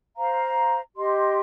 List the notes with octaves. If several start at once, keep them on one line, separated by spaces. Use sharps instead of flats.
C5 F5 A#5
G4 D#5 C6